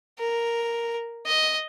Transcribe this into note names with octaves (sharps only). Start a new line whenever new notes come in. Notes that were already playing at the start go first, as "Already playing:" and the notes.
A#4
D#5